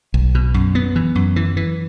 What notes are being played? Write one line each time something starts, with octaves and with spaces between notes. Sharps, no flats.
B1
B2
F#2
B3
E3
F#2
E3
E3